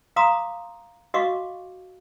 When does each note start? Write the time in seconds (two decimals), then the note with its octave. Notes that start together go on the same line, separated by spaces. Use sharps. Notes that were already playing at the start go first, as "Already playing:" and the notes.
0.16 F5 A#5 C6 D6 D#6
1.14 F#4 D#5 F5 C#6 D6